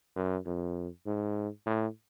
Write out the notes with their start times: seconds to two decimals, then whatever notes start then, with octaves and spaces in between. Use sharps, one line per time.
0.16 F#2
0.46 F2
1.06 G#2
1.66 A2